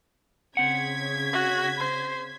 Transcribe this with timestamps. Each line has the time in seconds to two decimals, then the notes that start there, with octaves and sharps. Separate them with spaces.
0.57 C#3 C4 F#5 G#6 B6
1.33 F#4
1.78 C5